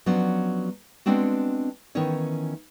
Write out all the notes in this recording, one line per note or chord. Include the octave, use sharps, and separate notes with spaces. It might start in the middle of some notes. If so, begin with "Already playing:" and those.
F3 F#3 B3 C#4 D4
G#3 B3 C4 D4 F#4
D#3 E3 B3 C#4 D#4 C#5